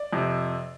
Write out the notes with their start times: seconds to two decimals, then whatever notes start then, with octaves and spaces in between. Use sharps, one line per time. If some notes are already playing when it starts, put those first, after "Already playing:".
Already playing: D5
0.13 F2 C3